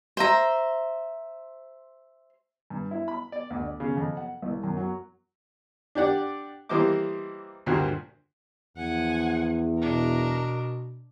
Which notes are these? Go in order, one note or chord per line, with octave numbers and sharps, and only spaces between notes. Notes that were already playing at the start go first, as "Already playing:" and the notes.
C5 E5 A#5
G2
E4
B5
D5
D2
D5
C#3
F2
F#5
C2
F#2
F#3
D4 G4 D5 F#5
E3 G3 A#3 C5 D#5 D6
D2 G2 A#2 F#4 A#4 C5
E2 F3 F#5 G#5
B2 D4 A#4